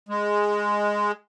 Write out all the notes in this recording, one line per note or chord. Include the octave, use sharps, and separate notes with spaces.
G#3